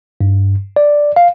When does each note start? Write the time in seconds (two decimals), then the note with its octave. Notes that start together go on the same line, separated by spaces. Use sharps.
0.21 G2
0.76 D5
1.16 F5